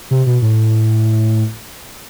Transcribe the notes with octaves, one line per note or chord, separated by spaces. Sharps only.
C3
B2
A2